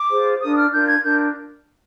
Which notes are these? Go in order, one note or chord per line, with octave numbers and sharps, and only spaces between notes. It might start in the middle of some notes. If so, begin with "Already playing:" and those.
Already playing: D6
F4 G#4 C5
D4 F4 A#4 D#6
F6
D4 F4 A#4 G6
G#6
D4 F4 A#4 G6